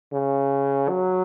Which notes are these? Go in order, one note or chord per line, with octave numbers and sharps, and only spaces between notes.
C#3
F#3